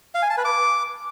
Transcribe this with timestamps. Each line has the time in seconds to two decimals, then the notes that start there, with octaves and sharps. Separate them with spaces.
0.15 F5
0.22 G#5
0.30 A5
0.37 B4
0.45 D6